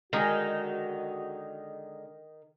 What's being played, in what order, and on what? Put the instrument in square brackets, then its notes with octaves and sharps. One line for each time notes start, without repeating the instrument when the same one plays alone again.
[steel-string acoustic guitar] D3 G#3 [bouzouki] D#3 D#4 [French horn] F#4 [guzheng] G#4 A#4